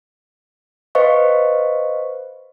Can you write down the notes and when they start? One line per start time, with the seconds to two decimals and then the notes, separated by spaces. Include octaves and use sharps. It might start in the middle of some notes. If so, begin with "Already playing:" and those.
0.95 B4 C5 D#5 F5 C#6